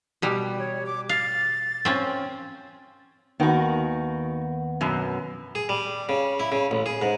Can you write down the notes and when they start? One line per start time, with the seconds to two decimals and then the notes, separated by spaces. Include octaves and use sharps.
0.22 B2 G3
0.59 C#5
0.86 D6
1.09 F5 A6
1.85 C4 C#4 F4
3.40 D#2 D#3 B3 F#4
4.81 F#2 B2
5.55 G#4
5.69 G3
6.09 C#3
6.40 E4
6.52 C#3
6.71 A1
6.86 G#4
7.02 G#2